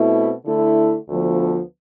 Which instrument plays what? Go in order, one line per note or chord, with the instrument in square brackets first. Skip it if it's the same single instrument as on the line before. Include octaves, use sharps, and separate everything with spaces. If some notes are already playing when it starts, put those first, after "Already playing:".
Already playing: [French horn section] B2 A3 C4 E4
D3 A3 E4
D2 D3 F3 B3